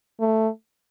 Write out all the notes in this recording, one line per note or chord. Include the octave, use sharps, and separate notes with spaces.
A3